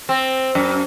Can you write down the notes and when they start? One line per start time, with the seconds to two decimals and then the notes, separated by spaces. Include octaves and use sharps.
0.09 C4
0.55 F#2